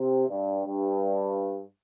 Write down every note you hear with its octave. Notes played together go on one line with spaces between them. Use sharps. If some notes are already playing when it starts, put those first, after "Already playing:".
Already playing: C3
G2
G2